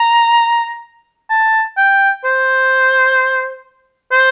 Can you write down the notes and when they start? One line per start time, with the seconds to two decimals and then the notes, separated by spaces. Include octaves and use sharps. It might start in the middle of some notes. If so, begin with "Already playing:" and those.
Already playing: A#5
1.30 A5
1.77 G5
2.24 C5
4.12 C5